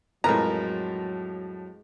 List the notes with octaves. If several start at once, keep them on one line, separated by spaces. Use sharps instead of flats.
F2 A2 F#3 G#3 A#4 B4 A#5